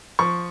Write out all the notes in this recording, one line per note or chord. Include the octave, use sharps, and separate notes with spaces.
F3 C#6